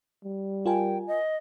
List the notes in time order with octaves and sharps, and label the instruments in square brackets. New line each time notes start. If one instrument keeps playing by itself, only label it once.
[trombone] G3
[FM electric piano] F4 A#4 G#5 [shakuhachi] G5
[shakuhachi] D#5